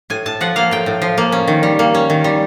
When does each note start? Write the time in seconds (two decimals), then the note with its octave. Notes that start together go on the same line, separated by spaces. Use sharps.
0.10 A2 G#5
0.26 A2 A5
0.41 F3 F#5
0.56 A#3 F5
0.71 A2 G5
0.86 A2
1.02 F3
1.18 A#3
1.32 C#4
1.48 D#3
1.63 G3
1.79 A#3
1.94 C#4
2.10 D#3
2.24 G3